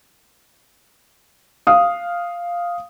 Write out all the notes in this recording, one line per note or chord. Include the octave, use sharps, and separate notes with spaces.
F5 D#6